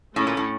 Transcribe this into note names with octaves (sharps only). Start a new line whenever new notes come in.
A2 A3 C#4 E4
A#2
A2